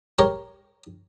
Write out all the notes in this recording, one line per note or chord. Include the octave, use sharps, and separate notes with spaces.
G4 A#4 C#5